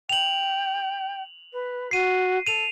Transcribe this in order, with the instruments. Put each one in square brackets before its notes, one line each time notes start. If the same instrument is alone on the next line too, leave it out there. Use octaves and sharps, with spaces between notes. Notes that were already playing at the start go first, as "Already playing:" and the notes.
[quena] G5 [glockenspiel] F7 F#7
[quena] B4
[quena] F#4 [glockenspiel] C7 D#7
[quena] A4 [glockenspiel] D#7 F7